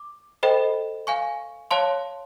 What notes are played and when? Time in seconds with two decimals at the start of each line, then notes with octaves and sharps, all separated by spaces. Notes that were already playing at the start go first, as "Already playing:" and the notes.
Already playing: D6
0.43 A4 C5 D#5 G5 B5
1.07 F5 G#5 C#6
1.71 C#5 F5 A5 C6